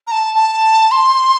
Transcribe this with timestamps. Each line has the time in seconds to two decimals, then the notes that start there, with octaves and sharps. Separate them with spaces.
0.07 A#5
0.11 A5
0.35 A5
0.91 C6